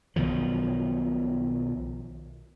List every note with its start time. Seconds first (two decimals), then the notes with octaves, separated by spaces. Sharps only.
0.16 B1 B2 D#3 F3